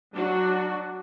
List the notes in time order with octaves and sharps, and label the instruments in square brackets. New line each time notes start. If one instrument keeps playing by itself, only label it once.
[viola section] F#3 D4 F#4